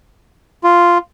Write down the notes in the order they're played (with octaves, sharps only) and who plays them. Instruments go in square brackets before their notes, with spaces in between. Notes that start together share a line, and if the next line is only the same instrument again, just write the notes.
[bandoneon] F4